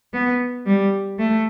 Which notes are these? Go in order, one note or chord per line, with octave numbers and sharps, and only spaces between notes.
B3
G3
A3